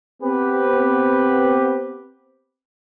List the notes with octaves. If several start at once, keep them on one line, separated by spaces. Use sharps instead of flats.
B3 C4 G4 B4